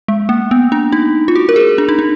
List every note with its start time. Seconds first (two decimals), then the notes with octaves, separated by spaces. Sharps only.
0.08 G#3
0.29 A#3
0.51 B3
0.72 D4
0.92 D#4
1.28 F4
1.35 F#4
1.49 A#4
1.56 G#4
1.78 D4
1.89 D#4
1.99 D4